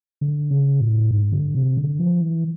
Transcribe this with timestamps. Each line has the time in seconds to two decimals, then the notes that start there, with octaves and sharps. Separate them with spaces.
0.21 D3
0.51 C#3
0.80 A2
1.11 G#2
1.32 D3
1.55 C3
1.77 D3
1.99 F3
2.21 E3